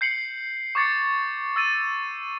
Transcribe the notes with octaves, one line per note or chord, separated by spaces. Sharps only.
G6 C7 C#7 F#7
C#6 D6 G#6 A6 C7 C#7
E6 A6 D#7